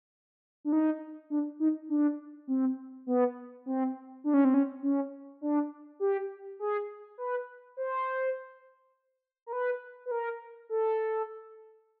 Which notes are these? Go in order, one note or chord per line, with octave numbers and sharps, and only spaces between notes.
D4
D#4
D4
D#4
D4
C4
B3
C4
D4
C#4
C4
C#4
C#4
D4
G4
G#4
B4
C5
A#4
B4
B4
A#4
A4